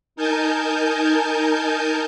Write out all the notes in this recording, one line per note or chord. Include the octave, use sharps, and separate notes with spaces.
D#4 A#4 G#5 A5 G6